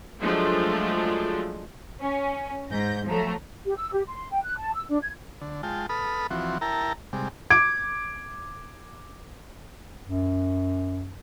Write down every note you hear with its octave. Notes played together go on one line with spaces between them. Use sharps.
F3 F#3 G#3 A3 D4 F4
C#4
G#2 G6 A#6
F3 F#3 A3 A#5
G4
E6
G4
C6
G5
F#6
A5
E6
D4
G#6
D3
G#3 F4 G5 A5
A4 B4 B5 D#6 F6
E3 F3 C4 F#4
E4 A#4 G5 A5 A#5
C3 G3 G#3
D6 G#6 D7
F#2